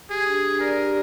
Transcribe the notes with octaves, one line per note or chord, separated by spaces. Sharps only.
G4 G#4
D4
D4
A#4 D5
G4